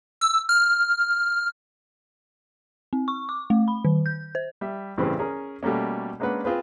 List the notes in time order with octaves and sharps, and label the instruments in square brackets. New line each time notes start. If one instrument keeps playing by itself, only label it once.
[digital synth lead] E6
F6
[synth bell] C4
C#6
D6
A3
B5
D#3
G6
C5
[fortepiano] G3 E5
A1 G2 C#3 E3 C4 B4
C#4 G#4 A#4
B2 G3 A3 A#3 C#4
G#3 A#3 C#4 D4 B4 F#5
C4 F4 G#4 B4 C5